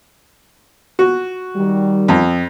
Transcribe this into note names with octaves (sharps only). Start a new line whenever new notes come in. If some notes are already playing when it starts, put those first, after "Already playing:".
F#4
D#3 G3
F2